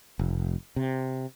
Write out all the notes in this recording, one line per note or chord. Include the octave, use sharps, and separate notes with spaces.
F1
C3